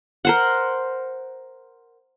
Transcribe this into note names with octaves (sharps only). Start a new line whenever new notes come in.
A#4 C5 F#5